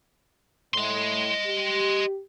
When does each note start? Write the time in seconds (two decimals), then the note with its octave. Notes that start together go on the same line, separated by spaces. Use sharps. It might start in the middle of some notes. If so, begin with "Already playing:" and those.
0.74 A2 D#5 C6
1.46 G4